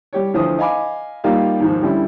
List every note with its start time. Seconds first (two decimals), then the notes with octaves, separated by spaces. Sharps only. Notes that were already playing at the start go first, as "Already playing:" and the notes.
0.13 G3 G4 C#5
0.34 D2 E3 F3 C5 D#6
0.59 D#5 F5 G#5 B5 D6
1.24 G3 A#3 D#4 F4 G4 F5
1.60 D#2 G#2 F3
1.82 A2 D3 G3 C#4 E4